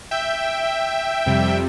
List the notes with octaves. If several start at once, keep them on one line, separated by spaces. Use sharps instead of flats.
E5 G5
F2 C3 G3